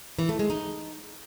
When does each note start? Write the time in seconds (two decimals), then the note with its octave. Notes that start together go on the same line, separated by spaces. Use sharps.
0.19 E3
0.29 A3
0.39 G#3
0.50 D#4